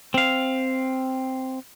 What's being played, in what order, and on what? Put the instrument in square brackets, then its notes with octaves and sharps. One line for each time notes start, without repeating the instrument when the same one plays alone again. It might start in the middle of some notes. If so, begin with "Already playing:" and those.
[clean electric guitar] C4 F5